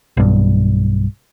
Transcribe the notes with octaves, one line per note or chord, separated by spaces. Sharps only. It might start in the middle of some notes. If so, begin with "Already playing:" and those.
B1 G2